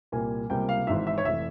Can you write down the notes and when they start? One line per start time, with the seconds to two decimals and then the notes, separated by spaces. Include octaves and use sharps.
0.12 C2 A#2 G3 A#3 G#5
0.50 C#2 C3 G3 A#3 G5
0.69 F5
0.87 G#1 G#2 E3 E5
1.07 E5
1.18 C#5
1.25 F1 E3 E5